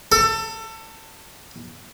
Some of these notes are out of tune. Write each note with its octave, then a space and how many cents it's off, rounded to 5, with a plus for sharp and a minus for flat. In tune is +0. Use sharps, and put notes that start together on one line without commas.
A4 +25